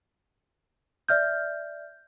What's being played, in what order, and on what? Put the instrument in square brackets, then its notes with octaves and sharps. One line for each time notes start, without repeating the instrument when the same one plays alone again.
[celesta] D5 E5 F6 G6